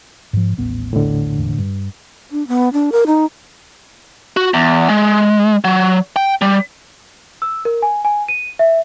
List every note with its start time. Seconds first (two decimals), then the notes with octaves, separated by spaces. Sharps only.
0.33 G#2 F3
0.58 D#1 A1 B3
0.93 A2 D3
1.37 E1
1.58 G2
2.32 D4
2.48 B3
2.73 D4
2.92 A#4
3.07 D#4
4.37 F#4
4.54 E2
4.90 G#3
5.64 F#3
6.16 G5
6.42 G3
7.42 E6
7.65 A#4
7.82 G#5
8.05 G#5
8.29 D#7
8.59 E5